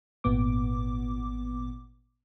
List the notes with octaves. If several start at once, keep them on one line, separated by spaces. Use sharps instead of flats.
G#1 A#2 B3 D6